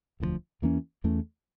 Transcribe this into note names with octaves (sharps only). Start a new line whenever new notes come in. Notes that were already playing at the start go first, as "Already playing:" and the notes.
E1 D2 D3 F3
E2 E3 A#3 C#4
E2 E3 A3 C#4